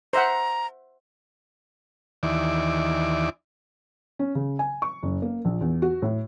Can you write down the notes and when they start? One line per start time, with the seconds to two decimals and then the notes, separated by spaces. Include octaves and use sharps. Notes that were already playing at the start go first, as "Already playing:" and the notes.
0.13 C5 E5 F#5 A#5
2.23 D#2 E3 D5
4.19 C#4
4.35 C#3
4.59 G#5
4.82 C#6
5.03 F#1
5.22 A#3
5.45 A#1
5.61 E2
5.82 F#4
6.02 A2